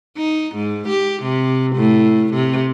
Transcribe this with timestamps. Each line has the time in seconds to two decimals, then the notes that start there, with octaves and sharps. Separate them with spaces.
0.18 D#4
0.55 G#2
0.88 G4
1.23 C3
1.76 A2
2.34 C3